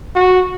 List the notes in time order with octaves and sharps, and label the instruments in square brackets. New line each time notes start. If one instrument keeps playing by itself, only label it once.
[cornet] F#4